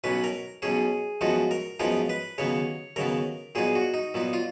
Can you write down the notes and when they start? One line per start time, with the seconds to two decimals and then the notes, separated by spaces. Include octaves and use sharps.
0.04 B1 B2 F#3 C#4 B4
0.24 A#4
0.62 B1 B2 F#3 C#4 G#4
1.21 F#2 F3 G#3 B3 D#4 F#4
1.51 A#4
1.80 F#2 F3 G#3 B3 D#4 A#4
2.10 B4
2.38 D#2 C#3 F#3 B3 C#5
2.96 D#2 C#3 F#3 B3 A#4
3.55 A#2 F#3 B3 D#4 G#4
3.75 F#4
3.94 D#4
4.14 A#2 F#3 B3 D#4
4.33 F4